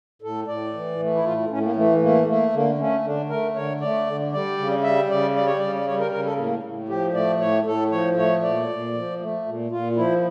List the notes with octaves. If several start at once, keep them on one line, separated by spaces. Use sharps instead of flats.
A2 A4
A2 D5
E3
A3
E4
A2 F4
A2 C#4
A3
A#3
E3 A3
A3 A#3
A3 A#3
D3 A#3
A3 C#4
D3 D4
A3 A#4
D3 C#5
A3 D5
D3
G3 D5
C#3
G3 E5
C#3 D5
G3 D5
C#5
C#3 D5
D5
G3 C#5
A#4
C#3 A#4
A4
A2 A#3
A2
F3 G4
A3 D5
A2 C#5
A2 A4
F3 C#5
A3 C#5
A#2 D5
A#2
F3
A3
A#2
A#2 F4
F3 E4